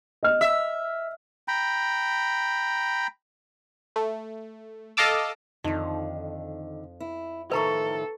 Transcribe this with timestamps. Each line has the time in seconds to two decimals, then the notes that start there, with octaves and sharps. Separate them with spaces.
0.23 D#5 F6
0.41 E5
1.48 G5 A#5 B5
3.96 A3
4.97 A4 D#5 F5 A5 D6 E6
5.64 F2 D3 D#3 D#4
7.00 E4
7.52 A2 D#3 F3 A4 B4 A#5 C#6